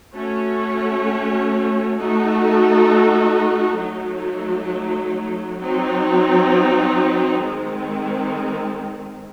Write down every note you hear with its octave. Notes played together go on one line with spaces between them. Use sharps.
A3 C#4 F#4 C#5
A3 D#4 F#4 A4
F#3 A3 D#4
F#3 C4 D#4
D#3 G#3 C4